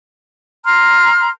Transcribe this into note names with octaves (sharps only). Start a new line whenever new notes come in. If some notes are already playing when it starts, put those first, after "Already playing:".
A#5 C6 F6